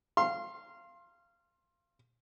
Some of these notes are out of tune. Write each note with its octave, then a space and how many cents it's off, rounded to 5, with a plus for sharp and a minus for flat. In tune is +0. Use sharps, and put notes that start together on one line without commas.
F5 -20 C6 +20